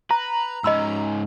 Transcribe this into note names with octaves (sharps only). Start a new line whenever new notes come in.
B4 A#5
G#2 C#4 D#5 B5 E6